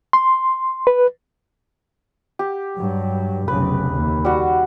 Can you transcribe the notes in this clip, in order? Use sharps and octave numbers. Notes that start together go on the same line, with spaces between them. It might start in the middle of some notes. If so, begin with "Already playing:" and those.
C6
B4
G4
G2 F#3
F1 B1 C#3 B4
D#2
G3 F#4